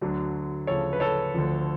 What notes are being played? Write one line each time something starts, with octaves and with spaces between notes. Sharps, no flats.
D2 D3 F#3
D2 C#3 F3 A4 C#5
B4
A4 C#5
D2 D3 F3